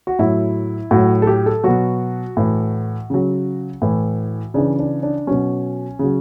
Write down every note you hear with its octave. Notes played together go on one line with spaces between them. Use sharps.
F#4
A2 F#3 E4
A2 F#3 F#4
A4
G4
A4
B2 F#3 F#4
A2 E3
C#3 F#3
A2 E3
C#3 E3 D4
D4
D4
B2 F#3 C#4
C#3 F#3